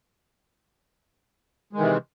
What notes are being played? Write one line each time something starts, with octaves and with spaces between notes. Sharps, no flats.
C3 D#3 E3 G#3